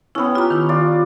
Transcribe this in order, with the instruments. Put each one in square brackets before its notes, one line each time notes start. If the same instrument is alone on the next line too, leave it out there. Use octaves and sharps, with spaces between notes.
[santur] B3 C#4 [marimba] E4 G5
[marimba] F4 A#5 [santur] G4
[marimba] D#3 E4
[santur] F4 D5